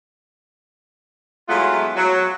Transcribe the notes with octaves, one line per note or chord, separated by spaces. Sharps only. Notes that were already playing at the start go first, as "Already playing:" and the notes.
F#3 G#3 A3 B3 E4 F4
F#3